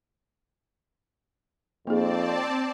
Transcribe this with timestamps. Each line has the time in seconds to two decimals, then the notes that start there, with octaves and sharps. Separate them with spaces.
1.87 F2 A#3 C4 D#4 G#4 D5 A5